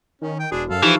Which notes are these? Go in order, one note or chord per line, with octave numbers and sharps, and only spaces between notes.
D#3 C#4
G5
E1 D4 F#4 G#4
F#2 A4 F5
E3 F3 D#4 G4 C#6